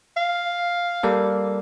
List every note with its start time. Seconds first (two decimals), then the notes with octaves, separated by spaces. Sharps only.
0.17 F5
1.03 G3 A#3 A4